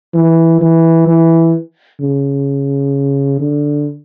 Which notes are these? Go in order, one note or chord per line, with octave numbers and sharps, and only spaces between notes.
E3
E3
E3
C#3
D3